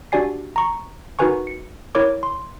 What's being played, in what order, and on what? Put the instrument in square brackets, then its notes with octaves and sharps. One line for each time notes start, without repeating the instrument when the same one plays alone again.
[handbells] D4 F#4 G4 D5 G#5 C7
A#5 C#6
D#4 F#4 A#4 B4 G#5 C#6
C#7
E4 A#4 C#5 D6
C6